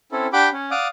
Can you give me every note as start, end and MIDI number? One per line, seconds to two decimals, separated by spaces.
0.12 0.27 60
0.12 0.27 61
0.12 0.27 64
0.12 0.27 69
0.33 0.49 62
0.33 0.49 67
0.33 0.49 78
0.33 0.49 79
0.33 0.49 83
0.33 0.49 86
0.53 0.71 61
0.71 0.88 74
0.71 0.88 77
0.71 0.88 78
0.71 0.88 86
0.71 0.88 87